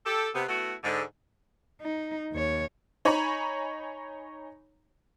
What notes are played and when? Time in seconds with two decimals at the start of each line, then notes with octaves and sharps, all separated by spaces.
0.05 G4 A4
0.35 C3 B3
0.48 A3 B3 E4 F#4
0.84 G#2 D3
1.81 D#4
2.33 D#2 C#5
3.05 D#4 C#5 G#5 A#5 B5 C#6